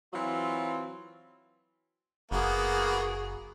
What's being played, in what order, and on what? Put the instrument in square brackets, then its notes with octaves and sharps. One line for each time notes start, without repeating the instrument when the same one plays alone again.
[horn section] E3 F#3 C4 F4
[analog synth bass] F#1 [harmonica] A#3 B3 [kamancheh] F#4 G#4